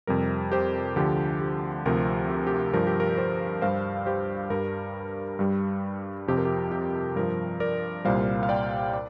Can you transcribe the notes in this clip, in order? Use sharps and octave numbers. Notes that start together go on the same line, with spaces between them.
F2 C3 G3 A#4
G4 C5
D2 D3 F3 G4
G4
D2 C3 F3 A#4
G4
G4
G2 F3 A#4
G4
A#4
G4 C5
G2 G3 C5 F5
G4 C5
G2 G3 A#4
G2 G3
F2 C3 F3 G4
A#4
G4
G4
G2 F3 A#4
A#4 D5
C2 A#2 G3 C5 F5
F5
D5 G5
D5